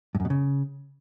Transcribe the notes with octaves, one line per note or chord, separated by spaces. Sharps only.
G2
F#2
B2
C#3